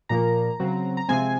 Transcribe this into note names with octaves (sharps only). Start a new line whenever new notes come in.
A#2 F3 A#3 A#5
C#3 F#3 C4
A#5
C3 F3 G#3 C4 G#5